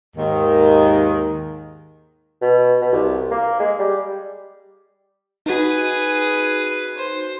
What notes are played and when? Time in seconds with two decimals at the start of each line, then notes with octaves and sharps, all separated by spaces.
0.16 D#2 G#2 D#3
2.42 B2
2.81 B2
2.93 C2
3.31 A#3
3.60 G#3
3.79 G3
5.46 D#4 F#4 G#4 B4
6.97 C5